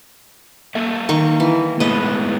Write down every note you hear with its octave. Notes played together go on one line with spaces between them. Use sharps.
A#3 A4 E5
D#3 C#6
E3
A2 G#3 B3 B4 D#5